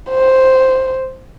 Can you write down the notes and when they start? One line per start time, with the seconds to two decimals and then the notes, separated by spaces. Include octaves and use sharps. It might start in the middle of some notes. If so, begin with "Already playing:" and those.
0.10 C5